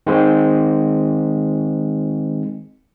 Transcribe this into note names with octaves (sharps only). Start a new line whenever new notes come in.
D#3 G#3 C4